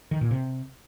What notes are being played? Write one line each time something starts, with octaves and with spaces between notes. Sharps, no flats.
D#3
A#2
C3